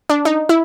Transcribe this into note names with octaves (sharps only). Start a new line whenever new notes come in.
D4
D#4
E4